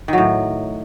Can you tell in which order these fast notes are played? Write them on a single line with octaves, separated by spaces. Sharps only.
D#3 F#3 A2